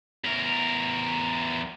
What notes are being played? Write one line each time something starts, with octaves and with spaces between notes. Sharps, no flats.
E2 A#4